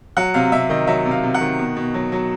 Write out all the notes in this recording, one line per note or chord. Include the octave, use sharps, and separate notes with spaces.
F#3 F#5
C3 F5
C3 E5
D#3 D#5
F#3 E5
C3
F5
C3
F#5
D#3
B2
B2
F#3
F#3